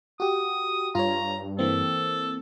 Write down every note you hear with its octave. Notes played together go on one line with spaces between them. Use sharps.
F#4 G4 D#6
G2 F4 C#5 A#5
E3 A#3 C4 A4